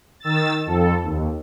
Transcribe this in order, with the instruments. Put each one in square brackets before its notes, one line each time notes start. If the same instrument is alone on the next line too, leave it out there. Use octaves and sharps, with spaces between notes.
[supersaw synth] D#3 E6 A6
F2 A4
D#2